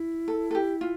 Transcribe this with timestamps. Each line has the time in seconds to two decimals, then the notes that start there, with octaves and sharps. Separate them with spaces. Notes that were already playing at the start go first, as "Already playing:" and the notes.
Already playing: E4
0.28 A4
0.51 A4
0.55 G4
0.81 F4